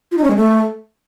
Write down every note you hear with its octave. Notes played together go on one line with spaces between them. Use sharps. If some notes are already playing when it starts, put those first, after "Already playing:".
F4
D#4
C#4
G#3
A3